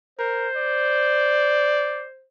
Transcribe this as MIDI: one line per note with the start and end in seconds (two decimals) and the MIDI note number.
0.19 0.48 70
0.19 2.25 72
0.57 2.06 74